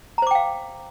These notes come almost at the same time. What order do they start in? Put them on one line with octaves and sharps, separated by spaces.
A#5 C5 D6 G5 F5